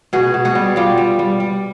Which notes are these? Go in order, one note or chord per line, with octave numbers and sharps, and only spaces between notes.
B2 F#4 G#4
B2
F#4 G#4
G3
G3 F4 G4
G3
G3
G3